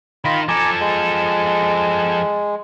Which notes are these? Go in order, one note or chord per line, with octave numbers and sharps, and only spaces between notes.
D#3 D#4 F4 B5
F3 A4 G#5 A#5 D6
G#3